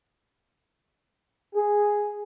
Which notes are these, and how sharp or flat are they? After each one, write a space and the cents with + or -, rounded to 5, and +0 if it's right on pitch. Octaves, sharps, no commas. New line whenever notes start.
G#4 -5